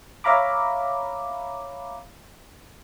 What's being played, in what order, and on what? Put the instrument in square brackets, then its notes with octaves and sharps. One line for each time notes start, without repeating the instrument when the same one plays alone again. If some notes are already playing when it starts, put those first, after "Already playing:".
[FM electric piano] C#5 E5 F5 A#5 B5 D6